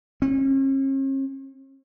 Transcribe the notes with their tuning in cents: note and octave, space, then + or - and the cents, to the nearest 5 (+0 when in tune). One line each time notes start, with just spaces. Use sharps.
C#4 -45